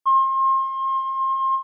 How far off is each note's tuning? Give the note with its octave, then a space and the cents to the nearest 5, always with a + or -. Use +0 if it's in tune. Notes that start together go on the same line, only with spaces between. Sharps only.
C6 +35